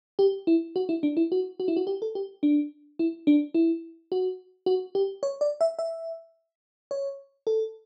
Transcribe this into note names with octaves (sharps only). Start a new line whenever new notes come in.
G4
E4
F#4
E4
D4
E4
F#4
F#4
E4
F#4
G4
A4
G4
D4
E4
D4
E4
F#4
F#4
G4
C#5
D5
E5
E5
C#5
A4